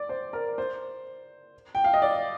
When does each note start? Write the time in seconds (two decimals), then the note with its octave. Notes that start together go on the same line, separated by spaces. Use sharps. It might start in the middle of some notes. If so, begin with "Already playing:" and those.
Already playing: D5
0.09 C5
0.33 A#4
0.58 C5
1.75 G5
1.84 F5
1.94 D#5
2.02 D5